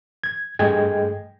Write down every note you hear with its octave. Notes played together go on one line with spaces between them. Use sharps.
G#6
G2 A3 G#4 D#5 G5 G#6